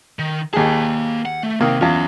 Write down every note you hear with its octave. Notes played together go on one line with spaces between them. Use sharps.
D#3
D#2 A#3 G#4 A5
F#5
A3
C3 D#3 A#3
E2 F#3 C#4 F4